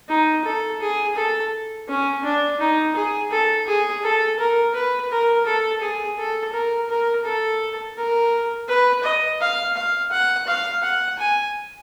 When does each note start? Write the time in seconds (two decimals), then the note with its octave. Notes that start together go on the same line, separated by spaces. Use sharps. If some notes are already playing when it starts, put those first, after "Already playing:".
0.09 D#4
0.44 A4
0.80 G#4
1.16 A4
1.88 C#4
2.24 D4
2.60 D#4
2.96 G#4
3.31 A4
3.66 G#4
4.03 A4
4.39 A#4
4.74 B4
5.11 A#4
5.46 A4
5.81 G#4
6.18 A4
6.53 A#4
6.89 A#4
7.25 A4
7.97 A#4
8.68 B4
9.03 D#5
9.40 F5
9.76 F5
10.11 F#5
10.47 F5
10.83 F#5
11.19 G#5